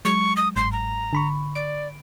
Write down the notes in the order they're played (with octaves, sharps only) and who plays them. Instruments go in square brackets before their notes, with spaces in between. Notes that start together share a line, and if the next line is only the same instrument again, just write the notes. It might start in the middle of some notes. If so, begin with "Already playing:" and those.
[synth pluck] F#3 G#3 [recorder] C#6
[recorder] D#6
[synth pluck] G1 G#2 [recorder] C6
[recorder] A#5
[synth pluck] D3 B5 C#6
[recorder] D5 [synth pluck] D7